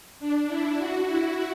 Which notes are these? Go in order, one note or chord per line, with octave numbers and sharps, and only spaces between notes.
D4
E4
F#4
E4